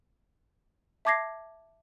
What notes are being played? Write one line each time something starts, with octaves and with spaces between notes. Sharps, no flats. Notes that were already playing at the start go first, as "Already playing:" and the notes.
E5 A5 D6 G#6 A#6 C7